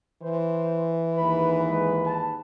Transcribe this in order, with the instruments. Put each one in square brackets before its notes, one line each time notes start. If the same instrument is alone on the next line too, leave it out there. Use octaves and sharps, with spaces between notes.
[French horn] E3 [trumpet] C5
[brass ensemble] D#2 G#2 B4 [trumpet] B5
[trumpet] G#3
A5